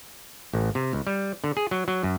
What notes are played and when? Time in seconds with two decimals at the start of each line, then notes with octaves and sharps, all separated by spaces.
0.54 A1
0.75 C3
0.93 C#2
1.07 G3
1.44 D3
1.57 G#4
1.71 F#3
1.88 F#3
2.03 F#2